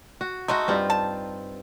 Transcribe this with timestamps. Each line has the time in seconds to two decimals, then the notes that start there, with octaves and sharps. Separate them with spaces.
0.21 F#4
0.48 G#3 A3 D#4 F#4
0.68 G2 C4 F4
0.90 A5